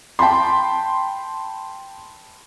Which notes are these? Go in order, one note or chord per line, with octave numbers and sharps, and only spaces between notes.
G5 A5 B5 C6